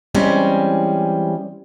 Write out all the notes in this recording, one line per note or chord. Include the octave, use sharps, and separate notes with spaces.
E3 G3 G#3 C4 C#4